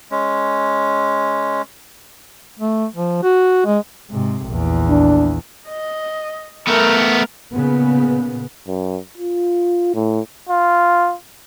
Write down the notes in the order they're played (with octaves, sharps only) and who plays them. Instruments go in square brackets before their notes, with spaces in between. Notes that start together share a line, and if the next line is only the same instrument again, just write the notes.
[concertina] G#3 C#4
[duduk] A3
F3
F#4
G#3
[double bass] G#2 C3
A#1 E2
[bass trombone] D4
[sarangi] D#5
[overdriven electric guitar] A3 B3 [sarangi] A#4
[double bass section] A#2 C#3 B3
[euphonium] F#2
F4
A2
[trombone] F4